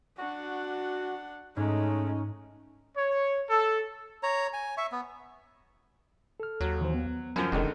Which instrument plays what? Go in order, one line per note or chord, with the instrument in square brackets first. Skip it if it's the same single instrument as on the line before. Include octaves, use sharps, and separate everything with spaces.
[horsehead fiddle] D4 F#5 [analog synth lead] F#4
[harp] G#2 [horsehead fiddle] G#3 A3 [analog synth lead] C#4 [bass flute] D#4
[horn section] C#5
A4
[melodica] C#5 A#5
G#5
E5 C#6
B3
[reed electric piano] A4 F6
[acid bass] D#2 [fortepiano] F#3
[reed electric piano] D#3 E3 C5
B3
[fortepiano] F#2 F3 [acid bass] F#3
[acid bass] F1 [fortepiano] C#2 D3 D#3